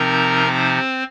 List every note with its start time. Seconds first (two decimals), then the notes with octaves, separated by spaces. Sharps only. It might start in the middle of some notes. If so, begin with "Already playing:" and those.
Already playing: C3 F3 C4 D#4 A#4 A#5
0.45 C4 C5